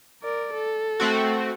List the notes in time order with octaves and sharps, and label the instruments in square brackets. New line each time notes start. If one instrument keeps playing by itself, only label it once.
[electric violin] A#4 D5
A4
[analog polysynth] A3 C4 F#4